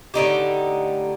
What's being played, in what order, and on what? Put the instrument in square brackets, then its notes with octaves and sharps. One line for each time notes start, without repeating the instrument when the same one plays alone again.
[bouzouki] A2 D3 D#4 G4